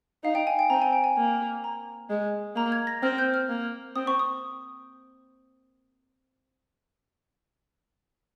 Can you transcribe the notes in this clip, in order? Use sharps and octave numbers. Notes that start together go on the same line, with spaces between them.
D#4 F5
G5
G#5
G5
C4 A#5
G#5
G5
G#5
A#3
A#5
G#3
A#3 A#5
G#6
A#6
C4 F6
G6
F6
A#3
C4 D#6
C#6
D#6